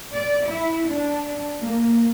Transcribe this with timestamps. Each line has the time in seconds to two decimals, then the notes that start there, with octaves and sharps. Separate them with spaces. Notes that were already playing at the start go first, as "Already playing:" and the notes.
0.13 D5
0.44 E4
0.87 D4
1.60 A#3